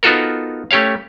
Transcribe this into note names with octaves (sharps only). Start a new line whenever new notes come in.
B3 D#4 F4 F#4 A4 A#4
A3 C#4 G4 C#5 F5